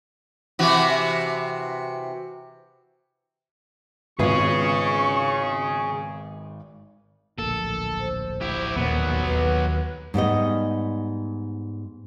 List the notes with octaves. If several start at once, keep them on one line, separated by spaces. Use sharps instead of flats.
C3 E3 F#4
G#1 B3 F4 G#4 B4 C#5 C#6
D1 A#1 A#3 A4
C5
E4 G4
D#2 A#2 F#3 B3
D#2 B4
G#2 G3 B3 D#5